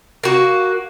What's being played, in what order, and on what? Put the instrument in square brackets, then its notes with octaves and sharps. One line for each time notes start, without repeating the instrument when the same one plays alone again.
[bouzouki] A#3 F#4